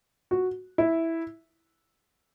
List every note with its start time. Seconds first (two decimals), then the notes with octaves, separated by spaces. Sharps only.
0.31 F#4
0.78 E4